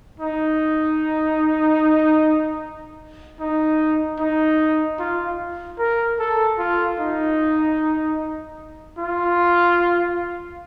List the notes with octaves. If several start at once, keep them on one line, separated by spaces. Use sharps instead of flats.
D#4
D#4
D#4
F4
A#4
A4
F4
D#4
F4